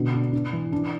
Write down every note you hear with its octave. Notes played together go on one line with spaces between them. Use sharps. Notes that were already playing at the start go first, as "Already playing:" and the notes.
Already playing: B2 D3
D4
D4
E3
D4